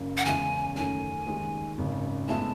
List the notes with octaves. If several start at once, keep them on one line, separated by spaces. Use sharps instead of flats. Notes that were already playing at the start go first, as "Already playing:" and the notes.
Already playing: F#1 F#2 C#3
F#5
E2 C#3 G#3 C#4 E4 G#5
F#2 D#3 A3 C#4 G#5
D#2 D#3 G#3
G#1 F#2 C#3
A2 G#3 B3 E4 A5